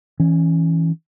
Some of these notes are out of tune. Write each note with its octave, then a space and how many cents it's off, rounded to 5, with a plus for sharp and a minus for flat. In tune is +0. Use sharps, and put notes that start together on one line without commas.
E3 -15 C#4 +0